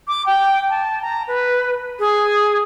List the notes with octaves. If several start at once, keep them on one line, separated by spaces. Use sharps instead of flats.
D6
G5
A5
A#5
B4
G#4